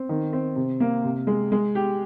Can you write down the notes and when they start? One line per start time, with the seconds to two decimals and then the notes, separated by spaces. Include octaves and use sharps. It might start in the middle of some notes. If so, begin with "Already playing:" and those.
Already playing: C4
0.09 D#3
0.33 C4
0.56 C3
0.80 A#3
1.04 C3
1.27 G#3
1.52 G#3
1.75 G4